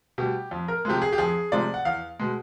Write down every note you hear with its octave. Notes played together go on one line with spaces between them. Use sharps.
B2 G3 G4
F2
A#4
C3 F3 G#3 G4
G#4
G4
F2 G#4
C3 F3 G#3 D5
F#5
E2 F5
B2 G#3